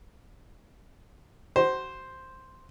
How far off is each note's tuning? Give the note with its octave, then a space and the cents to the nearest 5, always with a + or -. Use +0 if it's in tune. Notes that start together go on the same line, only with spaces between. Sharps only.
F#4 +30 C5 +0